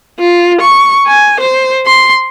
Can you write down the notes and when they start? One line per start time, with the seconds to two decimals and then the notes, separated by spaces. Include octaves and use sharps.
0.19 F4
0.61 C#6
1.08 G#5
1.40 C5
1.86 C6